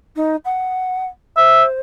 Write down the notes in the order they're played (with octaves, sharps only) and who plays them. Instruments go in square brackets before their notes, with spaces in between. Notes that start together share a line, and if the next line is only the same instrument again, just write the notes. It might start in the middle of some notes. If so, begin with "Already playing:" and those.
[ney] D#4
F#5
[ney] C5 [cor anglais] E5